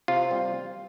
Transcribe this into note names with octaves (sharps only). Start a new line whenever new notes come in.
C3 F4
G3 C4